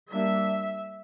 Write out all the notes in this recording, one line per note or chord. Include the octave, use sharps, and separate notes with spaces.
G3 A#3 D4 E5